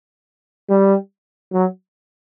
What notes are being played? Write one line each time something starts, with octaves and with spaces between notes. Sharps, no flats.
G3
F#3